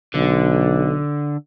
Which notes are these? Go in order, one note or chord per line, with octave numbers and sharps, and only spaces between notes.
B1 D3